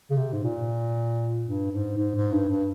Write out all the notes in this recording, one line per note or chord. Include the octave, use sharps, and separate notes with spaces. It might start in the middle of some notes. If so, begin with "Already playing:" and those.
C#3
C3
G#2
A#2
G2
G#2
G#2
G#2
G2
G2